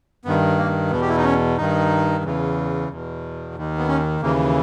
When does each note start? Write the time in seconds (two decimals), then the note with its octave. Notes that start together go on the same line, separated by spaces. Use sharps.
0.25 G2 D#3 B3
0.58 A#3
0.91 E2 B2 B3
1.02 G4
1.09 E4
1.17 D#4
1.24 C#4
1.57 G2 D#3 D#4
2.24 E2 C#3 E3
2.90 E2 B2
3.55 D#2 D#3
3.78 B3
3.88 C#4
4.21 D#2 C#3 E3 A#3